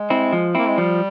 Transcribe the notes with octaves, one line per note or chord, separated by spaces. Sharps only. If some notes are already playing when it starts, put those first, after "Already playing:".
Already playing: G#3
C4 E4
F3
A#3 C4 E4
G#3
F3 G3